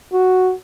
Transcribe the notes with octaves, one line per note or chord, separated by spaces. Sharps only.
F#4